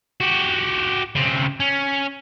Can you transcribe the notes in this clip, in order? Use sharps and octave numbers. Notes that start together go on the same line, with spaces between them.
F#4 G4
C#3 C4
C#4